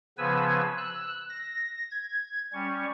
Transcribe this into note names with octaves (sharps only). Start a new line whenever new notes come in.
C#3 F3 B3 B4 G#5 E6
E6 F#6
A#6
G#6
G3 C#4 C#6